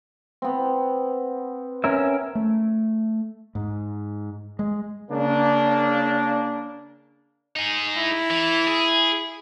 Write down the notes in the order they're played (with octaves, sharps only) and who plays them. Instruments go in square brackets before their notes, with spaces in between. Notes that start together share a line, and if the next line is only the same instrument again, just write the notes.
[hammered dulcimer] B3 C4
[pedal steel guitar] C#4 A#4 E5
[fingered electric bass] A3
G#2
G#3
[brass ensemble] C#3 A#3 D4
[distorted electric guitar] D#4 G#4
[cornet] E4
[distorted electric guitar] E3
G#4